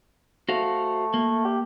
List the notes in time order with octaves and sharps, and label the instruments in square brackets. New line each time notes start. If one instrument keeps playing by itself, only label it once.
[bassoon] A3 [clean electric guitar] F#4 C5 F5
[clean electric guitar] A#3
[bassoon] G4